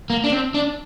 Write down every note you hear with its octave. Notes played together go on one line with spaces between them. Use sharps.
A#3
D4
C4
D4